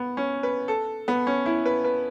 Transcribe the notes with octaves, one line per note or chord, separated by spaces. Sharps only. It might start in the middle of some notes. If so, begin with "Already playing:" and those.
Already playing: B3
C#4
B4
A4
B3
C#4
E4
B4
B4